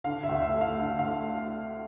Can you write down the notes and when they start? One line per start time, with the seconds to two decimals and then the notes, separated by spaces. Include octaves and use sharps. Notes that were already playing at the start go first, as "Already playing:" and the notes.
0.04 D3 F5
0.23 E5
0.29 D2
0.42 E5
0.54 A3
0.61 F5
0.79 D3 F5
0.99 F5
1.05 A3